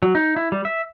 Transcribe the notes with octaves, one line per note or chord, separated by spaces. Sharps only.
F#3
D#4
E4
G3
E5